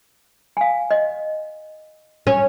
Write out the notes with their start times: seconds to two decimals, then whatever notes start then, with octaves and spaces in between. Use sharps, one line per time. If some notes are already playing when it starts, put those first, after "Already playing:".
0.57 F5 G#5
0.91 D#5
2.27 C#4